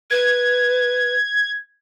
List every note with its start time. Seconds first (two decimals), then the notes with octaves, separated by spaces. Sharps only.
0.11 B4 G#6